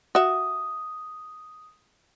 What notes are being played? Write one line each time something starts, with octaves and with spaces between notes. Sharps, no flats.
F#4 E5 D#6